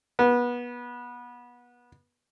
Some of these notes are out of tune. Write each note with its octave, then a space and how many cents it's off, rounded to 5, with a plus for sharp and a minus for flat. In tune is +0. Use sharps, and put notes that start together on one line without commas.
B3 -25